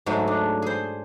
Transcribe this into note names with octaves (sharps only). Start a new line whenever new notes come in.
G#2 F#3 G#3 A3 E5
D4
G#4 C5